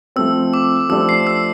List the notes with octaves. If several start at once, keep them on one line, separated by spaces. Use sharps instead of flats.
F3 A3 C4 E6
D6
F3 A3 D4 G4 C5 E6
C7
E6